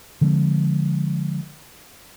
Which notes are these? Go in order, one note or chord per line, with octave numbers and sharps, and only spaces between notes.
D3 F3 G#3 C4